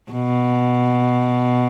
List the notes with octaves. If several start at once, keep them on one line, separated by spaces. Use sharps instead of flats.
B2